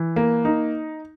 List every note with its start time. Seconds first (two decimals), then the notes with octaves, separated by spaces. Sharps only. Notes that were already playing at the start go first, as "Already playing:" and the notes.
Already playing: E3
0.16 A#3
0.45 D#4